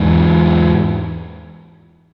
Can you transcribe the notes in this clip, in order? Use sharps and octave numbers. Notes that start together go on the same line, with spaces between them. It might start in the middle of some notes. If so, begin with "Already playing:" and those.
Already playing: E2 G#2